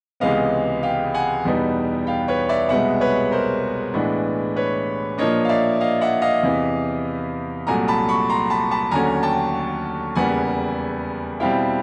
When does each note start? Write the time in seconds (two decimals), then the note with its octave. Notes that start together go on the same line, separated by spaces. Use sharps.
0.20 C#2 C3 E3 G#3 B3 D#5 F5
0.83 F5 G5
1.14 F#5 G#5
1.45 E2 B2 G3 B3 D#4
2.07 F5 G5
2.28 B4 C#5
2.49 D5 E5
2.69 C2 B2 G#3 B3 E5 F#5
3.01 B4 C#5
3.31 A#4 C5
3.94 A2 E3 G#3 B3 D4
4.56 B4 C#5
5.18 A#2 F3 A#3 D4 C#5 D#5
5.45 F5
5.49 D5 E5
5.81 D#5 F5
6.01 E5 F#5
6.22 D#5 F5
6.43 E2 C3 E3
7.67 C2 A#2 F#3 A3 G#5 A#5
7.88 A5 B5
8.09 B5 C#6
8.29 A#5 C6
8.50 A5 B5
8.71 A5 B5
8.91 D#2 D3 F#3 A3 C#4 G#5 A#5
9.23 G5 A5
10.15 E2 C#3 E3 G3 A#3 F#5 G#5
11.40 B2 G3 C4 E4 F5 G5